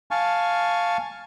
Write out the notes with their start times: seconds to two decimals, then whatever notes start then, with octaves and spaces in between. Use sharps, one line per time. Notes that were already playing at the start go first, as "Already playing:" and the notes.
0.11 F5 G#5 A5 C#6